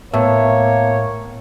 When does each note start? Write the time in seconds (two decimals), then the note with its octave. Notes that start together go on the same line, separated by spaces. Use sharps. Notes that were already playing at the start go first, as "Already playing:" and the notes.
0.14 A2 A#3 B3 C#5 E5 A5